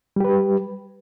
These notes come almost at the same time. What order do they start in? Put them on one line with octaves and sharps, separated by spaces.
G3 G4 B4